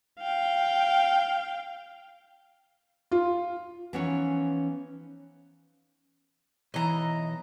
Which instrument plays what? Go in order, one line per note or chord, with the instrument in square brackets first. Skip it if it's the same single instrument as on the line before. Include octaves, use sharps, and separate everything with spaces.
[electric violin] F5 G5
[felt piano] F4
[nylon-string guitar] E3 F3 B3 C#4 D#4 C#5
[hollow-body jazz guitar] B1 E3 [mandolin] D#5 A#5